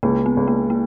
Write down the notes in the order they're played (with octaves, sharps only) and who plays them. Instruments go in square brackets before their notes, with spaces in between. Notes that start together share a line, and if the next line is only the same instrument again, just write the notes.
[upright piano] C#2 [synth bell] A#3
[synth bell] B3
[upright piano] C#2
[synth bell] A#3
A#3